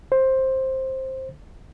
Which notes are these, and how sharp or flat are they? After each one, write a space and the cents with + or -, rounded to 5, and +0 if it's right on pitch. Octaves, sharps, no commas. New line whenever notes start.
C5 +10